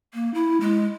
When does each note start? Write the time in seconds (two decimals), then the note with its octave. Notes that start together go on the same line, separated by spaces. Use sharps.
0.14 A#3
0.34 E4
0.61 G#3